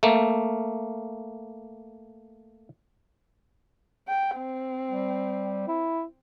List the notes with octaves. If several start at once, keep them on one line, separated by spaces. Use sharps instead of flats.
A3 A#3
G5
C4
G3
E4